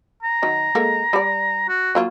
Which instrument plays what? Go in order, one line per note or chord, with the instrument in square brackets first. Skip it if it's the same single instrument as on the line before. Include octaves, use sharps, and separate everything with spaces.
[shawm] A#5
[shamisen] D#3 F#3
G#3 A#3 A4
G3 D5
[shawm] F#4
[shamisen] F#3 A#3 F4